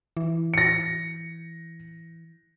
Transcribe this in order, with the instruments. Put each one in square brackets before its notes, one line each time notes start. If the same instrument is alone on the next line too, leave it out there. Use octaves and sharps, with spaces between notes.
[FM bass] E3
[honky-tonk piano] A#6 C#7